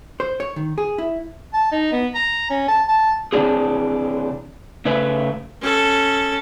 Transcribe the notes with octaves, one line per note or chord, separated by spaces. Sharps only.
C5
C#5
D#3
G#4
E4
A5
D#4
B3
A#5
C#4
A5
A5
C3 E3 A#3 D4 E4 G#4
C#3 A3 B4 E5
C#4 A4